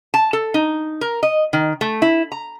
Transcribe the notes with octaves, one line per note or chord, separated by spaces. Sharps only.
A5
A4
D#4
A#4
D#5
D#3
A3
E4
A#5